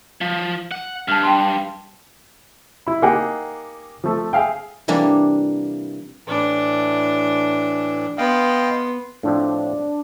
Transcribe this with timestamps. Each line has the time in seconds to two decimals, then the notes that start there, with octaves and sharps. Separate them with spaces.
0.21 F3
0.71 F#5
1.08 G2 A5 F6
1.23 G5 A5 C6
2.87 E4 B5
3.02 A#3 D#4 G4 G#4 F#5 G5
4.04 F3 A3 A4
4.33 G#4 E5 F5 G5
4.88 C3 E3 G3 A#3 D4
6.28 A2 E3 D4
8.18 B3 D#5 F5 G5 C6
9.23 A2 F3 C4 D4